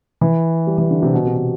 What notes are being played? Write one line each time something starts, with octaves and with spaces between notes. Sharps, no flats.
E3
G3
E3
D3
C3
B2
C3
B2